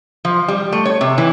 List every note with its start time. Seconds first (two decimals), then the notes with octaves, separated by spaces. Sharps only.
0.25 F3
0.48 G3
0.72 A3
0.85 C#5
1.01 C3
1.18 E3